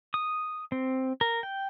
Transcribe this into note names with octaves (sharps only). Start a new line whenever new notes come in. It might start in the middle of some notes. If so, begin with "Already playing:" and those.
D#6
C4
A#4
G5